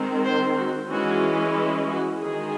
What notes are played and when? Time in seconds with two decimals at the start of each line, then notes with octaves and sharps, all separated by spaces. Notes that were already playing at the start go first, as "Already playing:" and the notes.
Already playing: D#3 G#3 C4
0.24 C5
0.56 F#4
0.89 E3 G#3 C#4 F#4
1.56 E4
1.89 F#4
2.21 D#3 G#3 D#4 G#4